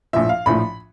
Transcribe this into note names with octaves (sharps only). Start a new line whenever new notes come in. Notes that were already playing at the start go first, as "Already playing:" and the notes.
A#1 A2 F3 E5
F5
A#1 A2 F3 B5